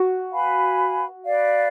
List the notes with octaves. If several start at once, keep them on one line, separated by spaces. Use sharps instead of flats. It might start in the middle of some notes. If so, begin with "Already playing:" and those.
Already playing: F#4
B4 F5 G#5 B5
B4 D5 F5